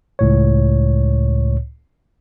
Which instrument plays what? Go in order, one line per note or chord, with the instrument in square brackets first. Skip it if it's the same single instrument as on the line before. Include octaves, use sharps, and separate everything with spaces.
[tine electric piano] C#2 A2 C#5